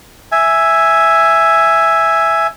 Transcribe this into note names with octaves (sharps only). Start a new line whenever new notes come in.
E5 G#5